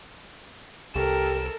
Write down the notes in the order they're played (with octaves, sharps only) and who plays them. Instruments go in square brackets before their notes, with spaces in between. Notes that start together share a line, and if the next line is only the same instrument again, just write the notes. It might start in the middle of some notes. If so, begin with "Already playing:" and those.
[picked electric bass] C2 [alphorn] G4 [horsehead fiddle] A4 A#4 [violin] E7